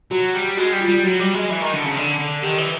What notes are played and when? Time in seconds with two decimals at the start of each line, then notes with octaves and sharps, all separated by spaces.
0.11 F#3 F#4
0.34 G3
0.57 G#3 F#4
0.73 G3
0.81 F4
0.88 G3
1.03 F#3 F#4
1.19 G3
1.34 G#3
1.50 E3
1.61 D#3
1.73 D3
1.85 C#3
1.96 D3
2.19 D3
2.42 D#3 G4
2.58 E3